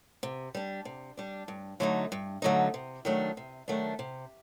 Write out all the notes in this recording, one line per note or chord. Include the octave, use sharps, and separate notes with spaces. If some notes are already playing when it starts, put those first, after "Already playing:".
C3
G3 D4
C3
G3 D4
G2
D3 F#3 A3 D#4
G2
D3 F#3 A3 D#4
C3
D#3 F#3 A3 D4
C3
D#3 F#3 A3 D4
C3